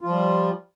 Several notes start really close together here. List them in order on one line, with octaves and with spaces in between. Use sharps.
F4 F3 G3